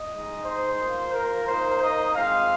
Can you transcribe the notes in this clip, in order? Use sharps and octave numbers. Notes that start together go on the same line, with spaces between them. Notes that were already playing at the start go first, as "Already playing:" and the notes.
Already playing: D#5
G#3 D#4
C5
A#3 F4
A#4
A#3 D#4 C5
D#5
G#3 C4 F4 F5